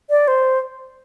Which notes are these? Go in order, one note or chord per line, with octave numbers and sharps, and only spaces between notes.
D5
C5